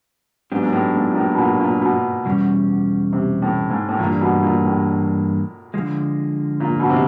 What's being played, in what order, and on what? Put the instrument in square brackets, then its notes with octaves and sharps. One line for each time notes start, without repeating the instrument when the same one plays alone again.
[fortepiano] G#2 [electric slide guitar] F#3 B3 D4 G4
[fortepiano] G#2
A2
G#2
A#2
A2
B2
A#2
A#2
B2
[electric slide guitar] E2 B2 G3 C#4
[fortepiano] C3
A2
G#2
A2
[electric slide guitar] G2 E3 G3 A#3 D4 [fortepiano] A#2
[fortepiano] B2
A#2
A2
[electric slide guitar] D3 F3 G#3
[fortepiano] A#2
B2
C3